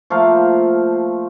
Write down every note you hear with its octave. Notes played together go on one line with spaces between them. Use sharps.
F3 A3 A#3 F5